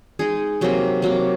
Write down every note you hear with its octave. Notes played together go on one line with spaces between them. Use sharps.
G#3 D#4 G#4
C3 F#3 A#3
C3 F#3 A#3